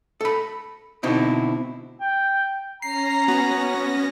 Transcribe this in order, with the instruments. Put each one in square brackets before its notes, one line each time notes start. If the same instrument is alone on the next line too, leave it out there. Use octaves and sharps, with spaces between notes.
[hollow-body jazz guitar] A4 B5
B2 D3 C4 D#4 E4
[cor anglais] G5
[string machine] C#4 A#6 [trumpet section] A#5 [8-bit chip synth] C7
[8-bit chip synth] B3 [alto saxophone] F#4